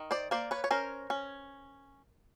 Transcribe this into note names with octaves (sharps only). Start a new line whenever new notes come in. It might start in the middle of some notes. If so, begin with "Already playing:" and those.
Already playing: D#3
C5 D5
A#3 C5 D5
B4 C#5
C#5
C#4 A#4 C5
C#4